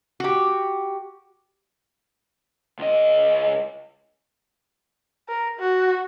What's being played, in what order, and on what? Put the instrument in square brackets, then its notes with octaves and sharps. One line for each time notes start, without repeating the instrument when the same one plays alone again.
[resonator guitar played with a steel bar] F#4 G4
[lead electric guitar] C#2 D#5
[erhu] A#4
F#4